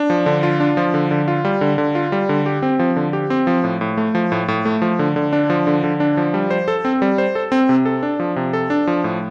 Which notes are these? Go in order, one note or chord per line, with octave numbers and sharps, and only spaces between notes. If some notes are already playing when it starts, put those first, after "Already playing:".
Already playing: D4
F3
D3
F4
D4
F3
D3
D3
F4
G3
D3
D3
F4
G3
D3
G4
C4
F3
D3
G4
C4
F3
A2
A2
A3
F3
A2
A2
A3
F3
D3
D3
D4
F3
D3
D3
D4
F3
G3
C5
A4
C4
G3
C5
A4
C4
C3
A4
D4
F3
C3
A4
D4
F3
A2